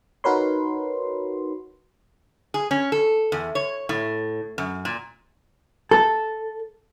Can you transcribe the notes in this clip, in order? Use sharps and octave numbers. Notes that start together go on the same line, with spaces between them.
D#4 F#4 A#4 B4 C#5 C6
G#4
C#4
A4
E2
C#5
A2
F#2
A#2
A4